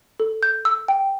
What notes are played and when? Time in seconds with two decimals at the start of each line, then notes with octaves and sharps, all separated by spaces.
0.20 A4
0.43 G6
0.65 E6
0.88 G5